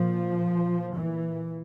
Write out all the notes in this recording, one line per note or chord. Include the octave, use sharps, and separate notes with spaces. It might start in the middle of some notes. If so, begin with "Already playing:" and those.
Already playing: A#2 F3
A#2
A#2 E3